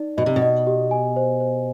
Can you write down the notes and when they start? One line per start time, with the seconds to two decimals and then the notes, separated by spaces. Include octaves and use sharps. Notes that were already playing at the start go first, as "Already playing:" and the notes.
Already playing: D#4 D5
0.17 B2 D#5
0.26 C3
0.36 B2
0.42 D#5
0.67 G4
0.91 G#5
1.16 C5
1.40 C5